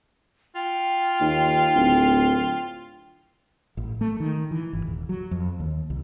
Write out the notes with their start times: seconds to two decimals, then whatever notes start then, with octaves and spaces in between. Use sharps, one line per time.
0.55 F4 G5
1.20 D#2
1.76 D1
3.77 A1
4.01 A3
4.20 D#3
4.51 E3
4.73 G1
4.86 D#1
5.09 F#3
5.31 F2
5.60 D#2
5.90 C2